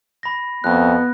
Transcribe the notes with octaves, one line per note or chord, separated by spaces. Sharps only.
B5 A#6
F2 B3 F#6